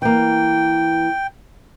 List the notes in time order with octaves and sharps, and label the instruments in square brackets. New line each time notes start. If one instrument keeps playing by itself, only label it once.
[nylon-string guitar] E3 A#3 [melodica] G5